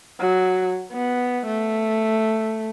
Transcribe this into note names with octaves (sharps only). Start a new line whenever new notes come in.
F#3
B3
A3